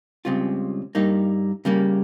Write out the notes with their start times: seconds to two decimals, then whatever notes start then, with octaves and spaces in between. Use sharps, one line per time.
0.25 C#2 C#3 G3 C4 F4
0.95 G2 G3 A#3 D#4
1.65 C#3 G3 A#3